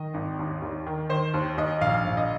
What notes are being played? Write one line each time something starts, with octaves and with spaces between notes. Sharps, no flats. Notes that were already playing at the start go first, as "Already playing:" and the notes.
Already playing: D#3 D#5
G#1
D#2
D#2
D#3
D#3 C5
D#2
D#2 D#5
A#1 F5
A#1
D#5